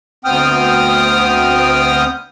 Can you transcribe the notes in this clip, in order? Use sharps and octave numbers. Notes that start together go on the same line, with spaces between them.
D2 B3 C4 G5 D#6 F6